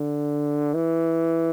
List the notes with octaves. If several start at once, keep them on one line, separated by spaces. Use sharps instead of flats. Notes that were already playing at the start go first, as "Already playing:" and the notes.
Already playing: D3
E3